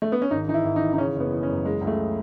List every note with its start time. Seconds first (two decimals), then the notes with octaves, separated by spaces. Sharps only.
0.02 A3
0.12 B3
0.22 C#4
0.31 G#1 D#4
0.48 E3 D#4
0.54 E4
0.64 G#1
0.76 D#4
0.82 E3
0.94 D#4
0.98 C#3 C#4
1.15 F#1 B3
1.32 E3
1.43 C#4
1.49 F#2
1.65 C#3 G#3
1.81 C#2
1.87 A3